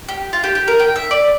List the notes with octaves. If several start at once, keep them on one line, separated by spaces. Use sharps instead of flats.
G4
F4
G4
G4
A#4
G5
E5
D5